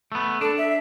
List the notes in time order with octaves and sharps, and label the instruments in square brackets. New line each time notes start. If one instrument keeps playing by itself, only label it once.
[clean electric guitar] A3 B3
[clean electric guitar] D4 [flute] A4
[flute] E5